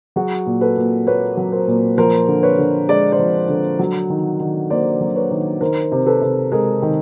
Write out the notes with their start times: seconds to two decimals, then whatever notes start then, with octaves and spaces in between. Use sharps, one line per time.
0.16 F#3 F#4 G#4
0.46 A#2
0.61 A4 B4
0.77 A#2
1.07 A#3 B4 C#5
1.37 F#3
1.52 A#4 C5
1.68 A#2
1.98 F3 A#4 C5
2.28 D3
2.43 B4 C#5
2.58 D3
2.88 G#3 D5
3.12 C5 D5
3.19 F3
3.49 D3
3.79 F#3
4.10 D#3
4.40 D#3
4.70 A#3 C5 D5
5.01 F#3
5.16 B4 C#5
5.31 D#3
5.61 D#3 A#4 C5
5.92 C3
6.06 A4 B4
6.22 C3
6.52 G#3 G#4 A#4
6.82 D#3